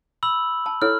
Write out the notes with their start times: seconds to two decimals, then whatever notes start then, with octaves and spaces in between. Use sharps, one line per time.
0.23 B5 E6 F#7
0.66 A5
0.82 E4 A4 C#5 F6